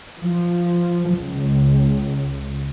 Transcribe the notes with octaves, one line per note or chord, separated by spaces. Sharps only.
F3
C#2